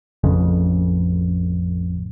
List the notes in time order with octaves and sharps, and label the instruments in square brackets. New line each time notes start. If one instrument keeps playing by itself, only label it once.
[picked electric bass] A1 F2 C#3